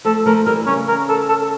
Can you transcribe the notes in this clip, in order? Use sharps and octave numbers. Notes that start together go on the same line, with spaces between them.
F3 A3 A4
F3 A3 A#4
E3 G3 A#4
C#3 C#4
A#4
A4
A4